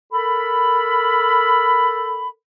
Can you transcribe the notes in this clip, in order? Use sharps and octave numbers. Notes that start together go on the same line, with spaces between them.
A4 A#4 B5